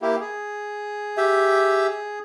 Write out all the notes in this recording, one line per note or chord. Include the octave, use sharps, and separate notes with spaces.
A#3 E4 G4
G#4
G4 E5